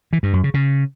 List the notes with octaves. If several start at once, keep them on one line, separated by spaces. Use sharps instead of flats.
E3
G2
F#2
C#3
C#3